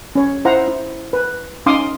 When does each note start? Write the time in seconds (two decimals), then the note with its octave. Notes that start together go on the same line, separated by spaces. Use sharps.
0.15 C#4 C#5
0.45 E4 C5 F5 F#5 A#5
0.68 E4
1.13 B4
1.66 C#4 D#4 F5 C6 D6 D#6